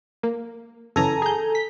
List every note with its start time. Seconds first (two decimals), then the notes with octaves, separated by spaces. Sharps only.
0.23 A#3
0.96 F#2 C#3 E3 A4 G#5 A#5
1.22 G#4 G6
1.55 B6